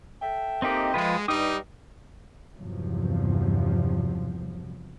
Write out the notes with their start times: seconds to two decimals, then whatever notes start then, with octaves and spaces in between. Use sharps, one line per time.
0.22 A4 E5 G5
0.62 A#3 C4 D#4 G4 D#5
0.94 F3 G#3 F4 B4
1.28 G2 G3 D#4 D#6
2.57 E2 G2 C3 F3 F#3